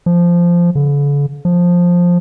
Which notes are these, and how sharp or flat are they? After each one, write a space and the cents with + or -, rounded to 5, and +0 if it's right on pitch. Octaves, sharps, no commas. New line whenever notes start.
F3 -10
D3 -45
F3 +10